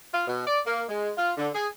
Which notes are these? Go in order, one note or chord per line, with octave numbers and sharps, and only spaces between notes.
F4
B2
D5
A#3
G#3
F4
D3
G#4